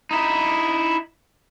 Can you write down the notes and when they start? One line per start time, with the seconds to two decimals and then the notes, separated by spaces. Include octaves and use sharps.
0.11 D#4 E4